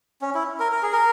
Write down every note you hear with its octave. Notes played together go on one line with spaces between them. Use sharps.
C#4
E4
A#4
A#4
G#4
A#4